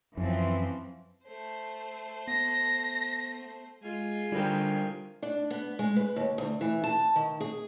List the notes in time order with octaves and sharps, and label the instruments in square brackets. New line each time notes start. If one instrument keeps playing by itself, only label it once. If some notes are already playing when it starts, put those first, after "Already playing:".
[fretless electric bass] F#2 [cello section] E3 F3 C4
[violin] A3 C5
[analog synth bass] B3 [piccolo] A#6
[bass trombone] G#3 [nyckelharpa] F4 G#5
[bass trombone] D3 [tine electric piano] G3 C5 [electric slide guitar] E4 A#4 G5
[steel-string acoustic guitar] D4
B3
G#3
B4
D#2
D2
E3
A5
D#3
G#4